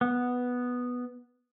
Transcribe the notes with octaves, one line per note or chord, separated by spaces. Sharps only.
B3